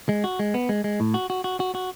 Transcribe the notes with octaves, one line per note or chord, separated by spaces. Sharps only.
G#3
F#4
G#3
B3
G#3
G#3
A2
F#4
F#4
F#4
F#4
F#4